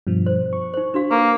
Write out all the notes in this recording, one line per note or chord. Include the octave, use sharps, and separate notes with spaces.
G2 B2 F3
C5
C#6
D#4 C5
D4 F#4 F5
A#3 B4